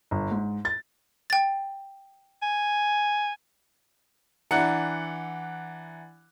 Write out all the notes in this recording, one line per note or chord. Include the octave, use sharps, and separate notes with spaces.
G1
G#2
A6
G5 A6
G#5
E3 D4 F#5 A#5 F#6 C#7